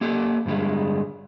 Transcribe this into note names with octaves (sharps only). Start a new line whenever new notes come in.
A#3 G4 A4
G2 D3 G3 G#3